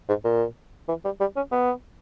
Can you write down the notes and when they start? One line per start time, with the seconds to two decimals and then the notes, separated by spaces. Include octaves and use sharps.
0.09 G#2
0.24 A#2
0.88 E3
1.05 G3
1.20 G3
1.36 C#4
1.52 B3